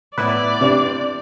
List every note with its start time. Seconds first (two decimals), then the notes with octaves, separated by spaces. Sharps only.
0.18 A2 B3 E4 B4 D5
0.61 C3 D4